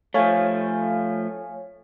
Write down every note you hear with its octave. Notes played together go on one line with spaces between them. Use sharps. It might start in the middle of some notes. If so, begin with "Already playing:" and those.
F3 A3 C#5 F5 G#5